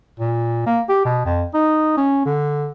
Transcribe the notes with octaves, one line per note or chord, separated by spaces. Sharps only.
A#2
A#3
G4
B2
F2
D#4
C#4
D3